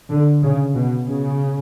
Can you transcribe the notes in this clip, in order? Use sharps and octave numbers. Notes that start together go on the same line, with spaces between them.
D3
C#3
B2
C#3